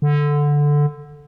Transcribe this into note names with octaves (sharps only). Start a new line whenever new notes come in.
D3